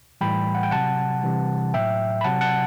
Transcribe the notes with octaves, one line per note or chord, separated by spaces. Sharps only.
A2 E3 G3 G5 B5
F#5
G5
C3 F#3 F#5 A5
C3 E3 G3
A2 F#3 E5 G5
B5
C3 F#3 F#5 A5
F#5 A5